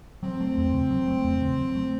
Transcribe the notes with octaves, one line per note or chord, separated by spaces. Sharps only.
F#3 C4
A3
E2
C#3
F#3
A3
E2
C#3
F#3
A3